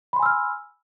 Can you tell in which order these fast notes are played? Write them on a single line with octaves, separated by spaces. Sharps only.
B5 C6 G#5 E6 F6